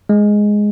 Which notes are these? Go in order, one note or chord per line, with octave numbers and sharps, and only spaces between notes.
G#3